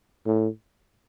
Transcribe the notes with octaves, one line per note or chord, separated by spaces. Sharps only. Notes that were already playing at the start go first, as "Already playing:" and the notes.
A2